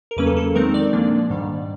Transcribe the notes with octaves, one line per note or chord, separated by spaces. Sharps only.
A#4
E2 C#3 F#3 A#3 C#4 B4
A4
A4
D#3 G#3 C4 D#4 A#4
D5
A#2 F3 A#3 D4
G#2 D#3 G3